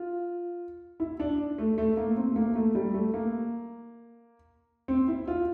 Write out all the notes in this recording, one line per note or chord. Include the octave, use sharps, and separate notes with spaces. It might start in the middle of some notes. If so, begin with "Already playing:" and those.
Already playing: F4
E4
D4
A3
A3
A#3
C4
A3
A#3
A3
G3
A3
A#3
C4
E4
F4